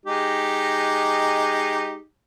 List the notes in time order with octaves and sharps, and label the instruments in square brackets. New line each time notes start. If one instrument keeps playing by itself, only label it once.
[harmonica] G#3 D#4 G4